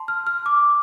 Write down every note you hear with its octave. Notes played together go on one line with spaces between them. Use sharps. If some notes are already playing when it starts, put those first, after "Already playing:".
Already playing: A5 C6
F6
F6
D6